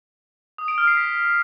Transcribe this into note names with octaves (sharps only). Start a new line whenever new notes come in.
D#6
D7
F6
C7
B6